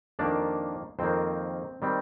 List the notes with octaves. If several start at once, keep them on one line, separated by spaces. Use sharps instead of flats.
F2 D#3 A#3 D4 D5
F2 D#3 A#3 C4 C5
D#3 G3 C4